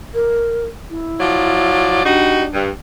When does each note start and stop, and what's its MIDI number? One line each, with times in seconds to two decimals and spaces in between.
0.14 0.65 70
0.90 2.03 64
1.20 2.02 53
1.20 2.02 54
1.20 2.02 74
2.05 2.45 55
2.05 2.52 62
2.05 2.45 63
2.05 2.45 66
2.53 2.70 43